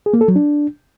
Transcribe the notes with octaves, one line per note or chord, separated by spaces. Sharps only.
G#4
A#3
A4
F#3
D4